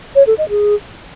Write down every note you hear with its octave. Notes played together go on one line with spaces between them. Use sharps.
C#5
A4
D#5
G#4